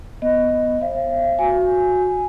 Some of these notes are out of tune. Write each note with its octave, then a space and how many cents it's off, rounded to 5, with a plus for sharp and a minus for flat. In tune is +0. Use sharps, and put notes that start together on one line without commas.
B3 +5 D#5 +0
C5 +40 F5 -40
F#4 -15 G#5 +0